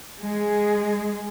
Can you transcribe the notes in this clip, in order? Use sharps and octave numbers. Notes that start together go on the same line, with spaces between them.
G#3 G#4